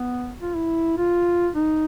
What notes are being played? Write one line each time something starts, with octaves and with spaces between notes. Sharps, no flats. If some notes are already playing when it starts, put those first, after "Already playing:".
Already playing: B3
F4
E4
F4
D#4